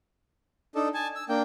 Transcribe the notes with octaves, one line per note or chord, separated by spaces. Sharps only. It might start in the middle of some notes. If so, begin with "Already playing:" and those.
D4 D#4 A4
G#5 A5
E6
A#3 D4 G5